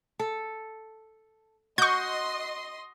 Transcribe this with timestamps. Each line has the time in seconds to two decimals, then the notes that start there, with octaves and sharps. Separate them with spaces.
0.19 A4
1.78 F#4 D#5 C6 C#6 G6